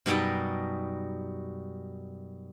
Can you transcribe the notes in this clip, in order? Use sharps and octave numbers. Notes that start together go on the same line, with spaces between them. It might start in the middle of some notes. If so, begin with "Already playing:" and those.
F#2 B2 G3 D#4 G5 A5